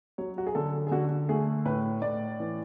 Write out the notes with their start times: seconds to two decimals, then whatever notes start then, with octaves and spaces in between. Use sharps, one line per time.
0.18 F#3 C#5
0.38 F#4
0.47 G#4
0.55 D3 A4
0.87 G#4
0.91 D3 F#4
1.29 A3 G#4
1.65 A2 B4
2.02 A2 D5
2.40 E3